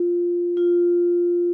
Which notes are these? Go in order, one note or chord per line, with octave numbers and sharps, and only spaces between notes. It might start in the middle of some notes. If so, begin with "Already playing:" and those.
Already playing: F4
F4